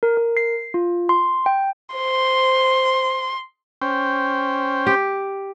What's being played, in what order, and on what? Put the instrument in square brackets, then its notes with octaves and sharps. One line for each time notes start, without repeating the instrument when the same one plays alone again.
[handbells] A#4
A#4
C7
F4
C6
G5
[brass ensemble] C5 [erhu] C6
[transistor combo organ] C#4 C5 G5
[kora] G4